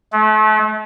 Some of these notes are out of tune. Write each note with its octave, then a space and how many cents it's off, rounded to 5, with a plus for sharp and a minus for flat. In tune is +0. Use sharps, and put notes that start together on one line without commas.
A3 -35